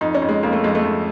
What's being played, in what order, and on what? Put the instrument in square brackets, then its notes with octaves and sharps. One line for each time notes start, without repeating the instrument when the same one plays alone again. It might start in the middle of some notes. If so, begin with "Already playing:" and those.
[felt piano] F2 D#4
C#4
F2
G#3
F2 A#3
A3
F2 G#3
A3
F2